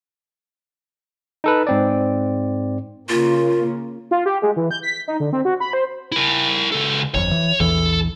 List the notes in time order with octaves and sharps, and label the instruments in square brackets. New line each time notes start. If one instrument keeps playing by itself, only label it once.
[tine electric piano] D#4 A4 B4
G#2 C4 D5
[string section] C#3 A#3 [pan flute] F4
[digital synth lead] F4
G4
G#3
E3
G6
B6
D#4
D3
C4
F#4
B5
C5
[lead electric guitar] E4 A#4
C#2 A4
[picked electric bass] G1 F2 [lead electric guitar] C#5
[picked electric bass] E3
[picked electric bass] A#1 E2 E3 [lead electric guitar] A4